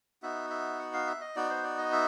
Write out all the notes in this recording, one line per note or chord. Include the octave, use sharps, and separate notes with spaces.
B3 D#4 F#4 E5
E5
F#5
F5
E5
D#5
B3 D#4 F#4 D5
C5
D5
D#5
E5